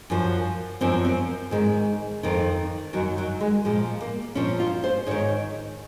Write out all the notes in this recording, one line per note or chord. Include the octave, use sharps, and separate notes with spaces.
F#2 F3
F#2 F3 C4
C4
G#2 D#3 G#3
F2 D#3
F#2 D#3 F#3
F#3
G#3
A#2 F3 G#3
A#3
A#2 F3 C#4
F4
C5
G#2 D#3 C#5